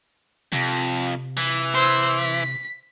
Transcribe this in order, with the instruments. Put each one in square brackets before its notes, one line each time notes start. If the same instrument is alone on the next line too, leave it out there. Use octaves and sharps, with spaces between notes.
[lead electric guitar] F2 [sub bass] C3
[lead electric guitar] E3
[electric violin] C5 E6
B6